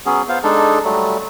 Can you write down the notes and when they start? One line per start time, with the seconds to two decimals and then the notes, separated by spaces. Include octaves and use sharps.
0.06 F#3 B3 C#4 G#4
0.29 B3 F4 C5 F5
0.44 G#3 D4 D#4 A4
0.85 F#3 G3 A3